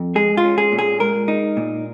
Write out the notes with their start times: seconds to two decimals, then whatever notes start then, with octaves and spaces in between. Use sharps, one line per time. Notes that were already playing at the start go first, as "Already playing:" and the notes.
Already playing: F2
0.15 G#3 G#4
0.37 F4
0.44 C#4
0.58 G#4
0.72 A#2
0.79 G#4
1.00 G#3 A#4
1.28 D#4
1.57 A#2